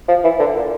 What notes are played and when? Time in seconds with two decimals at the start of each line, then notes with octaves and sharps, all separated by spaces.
0.08 F3
0.24 E3
0.39 D3
0.55 A#2